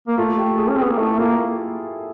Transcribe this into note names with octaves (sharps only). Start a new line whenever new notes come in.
A#3
A3 F4
G4
G#4
C#4
C4
A4
B3
A#3
A3 E4
A#3 F4